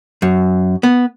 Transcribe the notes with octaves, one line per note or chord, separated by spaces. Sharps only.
F#2
B3